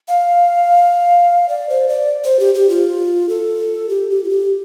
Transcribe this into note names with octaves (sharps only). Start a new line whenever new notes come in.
F5
D5
C5
D5
C5
G4
G4
F4
A4
G4
G4
F4
G4